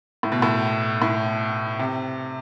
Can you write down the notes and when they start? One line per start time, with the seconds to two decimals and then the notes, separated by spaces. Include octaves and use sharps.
0.23 A2
0.32 B2
0.42 A2
1.02 A2
1.79 C3